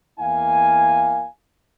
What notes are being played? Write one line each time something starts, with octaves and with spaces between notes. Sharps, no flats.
E2 A#3 E4 F5 G#5